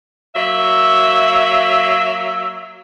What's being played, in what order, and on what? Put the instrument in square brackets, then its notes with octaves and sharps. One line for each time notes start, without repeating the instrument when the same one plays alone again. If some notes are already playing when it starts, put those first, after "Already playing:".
[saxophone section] F#3 A#3 E5